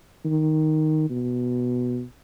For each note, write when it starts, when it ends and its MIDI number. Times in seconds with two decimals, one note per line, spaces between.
0.25 1.06 51
1.10 2.03 47